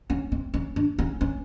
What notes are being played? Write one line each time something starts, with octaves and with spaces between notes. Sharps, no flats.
C#4
C4
C#4
D4
C#4
C#4